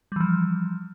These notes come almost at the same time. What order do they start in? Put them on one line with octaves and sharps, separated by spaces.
G3 E3 F3